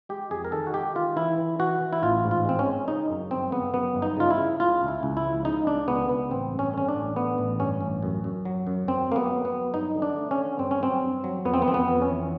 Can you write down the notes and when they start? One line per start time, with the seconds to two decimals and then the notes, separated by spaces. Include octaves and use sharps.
0.09 G#3 G4
0.31 F2 G#4
0.45 A#4
0.52 D#3 A4
0.67 F#4
0.73 G#3 G4
0.95 D#3 F4
1.16 E3 E4
1.38 E3
1.59 E3 F#4
1.81 E3
1.93 E4
2.02 A1 F4
2.24 G#2
2.31 F4
2.45 G#3 C4
2.59 C#4
2.67 G#3
2.88 C#3 D#4
3.09 F#2
3.31 G1 C4
3.52 C#3 B3
3.74 F#2 B3
3.95 G1
4.02 D#4
4.17 C#3 F4
4.31 E4
4.38 C#3
4.60 C#2 F4
4.81 C#2
4.88 E4
5.03 C#2
5.17 E4
5.24 F3
5.45 C#3 D#4
5.67 C#2 D4
5.88 C#2 B3
6.09 C#2 B3
6.31 A1 C4
6.52 G2
6.59 C#4
6.74 D3 C#4
6.88 D4
6.95 A1
7.16 D3 B3
7.38 A1
7.60 G2 C#4
7.81 A1
8.03 F#2
8.24 F#2
8.45 F#3
8.67 F#2
8.88 F#2 C4
9.09 F#3 A#3
9.16 B3
9.31 F#3
9.45 B3
9.52 F#3
9.74 G2 D#4
9.95 D3
10.02 D4
10.17 A3
10.31 C#4
10.38 D3
10.59 G2 C4
10.71 C#4
10.81 F#3 C4
11.02 G2
11.24 F#3
11.45 F2 B3
11.54 C4
11.62 B3
11.66 F2 C4
11.74 B3
11.88 F2
12.02 C#4
12.09 E3